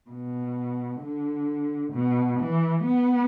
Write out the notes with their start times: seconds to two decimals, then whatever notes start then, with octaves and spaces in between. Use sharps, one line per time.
0.10 B2
1.01 D3
1.93 B2
2.40 E3
2.85 B3